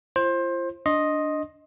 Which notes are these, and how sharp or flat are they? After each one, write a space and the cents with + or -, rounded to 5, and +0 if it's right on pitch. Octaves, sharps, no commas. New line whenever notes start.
F4 -35 C5 +20
D4 +0 D#5 +0 C6 +25